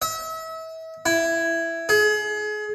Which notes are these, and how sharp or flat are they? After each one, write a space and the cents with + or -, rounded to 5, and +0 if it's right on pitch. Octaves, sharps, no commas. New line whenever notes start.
E5 -35
E4 +10
G#4 +30